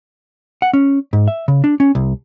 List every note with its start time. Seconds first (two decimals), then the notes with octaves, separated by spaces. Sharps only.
0.62 F#5
0.73 C#4
1.13 G#2
1.28 E5
1.48 C#3
1.64 D4
1.80 C#4
1.95 C2